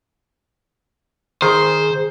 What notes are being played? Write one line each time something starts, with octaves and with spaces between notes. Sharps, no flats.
D#3 G#4 C5